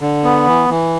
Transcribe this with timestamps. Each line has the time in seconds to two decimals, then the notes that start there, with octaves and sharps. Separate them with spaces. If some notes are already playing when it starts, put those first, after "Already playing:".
0.01 D3
0.24 B3
0.47 E3
0.69 E3